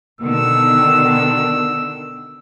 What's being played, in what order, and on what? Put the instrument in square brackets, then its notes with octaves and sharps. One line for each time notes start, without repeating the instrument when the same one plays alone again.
[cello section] B2 D3 D#3 [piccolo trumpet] E6